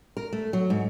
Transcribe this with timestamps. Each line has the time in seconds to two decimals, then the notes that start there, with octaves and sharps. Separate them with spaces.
0.17 A#4
0.33 A3
0.53 F#3
0.70 G#2